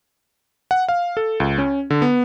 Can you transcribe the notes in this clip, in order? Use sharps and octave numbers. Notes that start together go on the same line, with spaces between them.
F#5
F5
A4
C#2
C#4
D3
B3